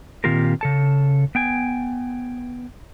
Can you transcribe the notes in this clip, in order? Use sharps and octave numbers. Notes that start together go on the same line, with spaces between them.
A#2 D#3 C4 F4 G4 A#4
C#3 A4 A5
B3 G5 G#5